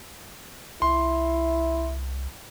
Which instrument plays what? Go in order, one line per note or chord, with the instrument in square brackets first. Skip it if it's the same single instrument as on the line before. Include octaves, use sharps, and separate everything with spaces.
[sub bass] C2 [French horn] E4 [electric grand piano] C6